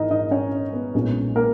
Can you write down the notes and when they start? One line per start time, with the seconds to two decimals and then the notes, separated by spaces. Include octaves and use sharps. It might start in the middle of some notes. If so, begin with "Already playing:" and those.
Already playing: G#1 G#2 E3 G#3 D#4 A#4 D#5 A#5
0.11 D#4 D#5
0.31 C#4 C#5
0.73 B3 B4
0.94 B1 A#2 G#3 C#4
1.36 A#3 A#4